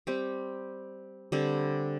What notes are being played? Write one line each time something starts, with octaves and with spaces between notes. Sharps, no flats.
G3 C4 G4
D3 G3 C4